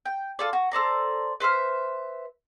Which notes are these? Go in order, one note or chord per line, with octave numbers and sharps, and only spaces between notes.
G5
F4 A4 D5
F#4
A4 C5 D5 A#5
B4 C5 E5 F6